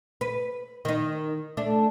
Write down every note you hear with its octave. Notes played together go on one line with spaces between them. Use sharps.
B4
D#3 D#4
A3 D4